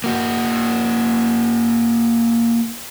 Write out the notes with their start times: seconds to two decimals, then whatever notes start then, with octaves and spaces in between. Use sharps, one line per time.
0.04 A#3 F#4